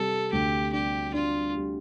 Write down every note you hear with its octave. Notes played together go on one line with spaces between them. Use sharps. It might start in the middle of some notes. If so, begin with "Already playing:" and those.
Already playing: C3 G3 A4
D2 G4
D4 G4
D4 F4
G3